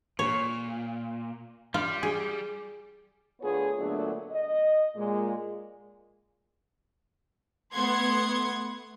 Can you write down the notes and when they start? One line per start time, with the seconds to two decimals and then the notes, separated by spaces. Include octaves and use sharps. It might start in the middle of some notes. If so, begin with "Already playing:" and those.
0.19 A#2 C#5
1.74 G3 F4
2.03 G#4
3.41 D3 A3 B3 F4 G#4 C#5
3.79 A#2 D3 F#3 A3 B3 D4
4.31 D#5
4.96 A#2 G#3
7.74 A3 B3 F#5 C6 G#6